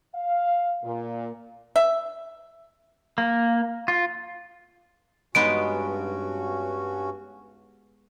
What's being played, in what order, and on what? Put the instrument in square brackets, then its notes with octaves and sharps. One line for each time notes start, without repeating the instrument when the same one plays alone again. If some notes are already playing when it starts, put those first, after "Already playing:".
[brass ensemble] F5
A#2
[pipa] E5
[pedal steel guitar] A#3
F4
[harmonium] G2 C#4 F#4 [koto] G#3 B3 D#4 [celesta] D7